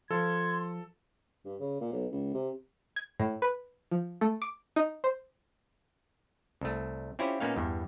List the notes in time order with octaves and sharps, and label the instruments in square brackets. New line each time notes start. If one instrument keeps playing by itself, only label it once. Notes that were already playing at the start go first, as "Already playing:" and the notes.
[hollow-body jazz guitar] F3 [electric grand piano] A4 [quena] C6 [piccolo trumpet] G#6
[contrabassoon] G2
C#3
A#2
B1
C#2
C3
[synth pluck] G#6
A2
B4
F3
A3
D6
D#4
C5
[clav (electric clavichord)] C2 A3
C4 C#4 E4 F4 G4 C#5
A#2 A#3 B3 C#4 D#4 F5
E2 G2